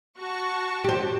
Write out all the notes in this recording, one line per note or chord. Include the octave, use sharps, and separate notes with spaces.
F#4 A5 C#6
G4 C5